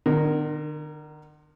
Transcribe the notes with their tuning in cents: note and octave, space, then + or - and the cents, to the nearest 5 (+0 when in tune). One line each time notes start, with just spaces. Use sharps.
D3 +45 A#4 +0